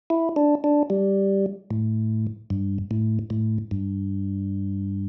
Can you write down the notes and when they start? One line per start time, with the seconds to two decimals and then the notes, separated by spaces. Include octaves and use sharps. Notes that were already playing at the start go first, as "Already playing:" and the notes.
0.10 E4
0.36 D4
0.64 D4
0.90 G3
1.71 A2
2.50 G2
2.91 A2
3.30 A2
3.71 G2